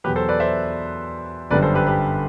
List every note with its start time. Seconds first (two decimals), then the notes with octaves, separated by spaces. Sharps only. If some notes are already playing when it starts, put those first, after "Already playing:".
0.04 E2 B2 F#3 G4 B4
0.16 A4 C5
0.28 B4 D5
0.40 C5 E5
1.51 G1 F#2 D3 G3 B4 D5
1.62 A4 C5
1.74 G4 B4
1.87 G4 B4